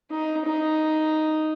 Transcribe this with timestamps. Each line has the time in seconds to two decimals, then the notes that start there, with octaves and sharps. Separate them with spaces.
0.11 D#4
0.46 D#4